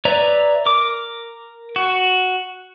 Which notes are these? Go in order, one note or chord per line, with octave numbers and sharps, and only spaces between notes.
B4 C#5 D5 E5 A#5
A#4 D6
F#4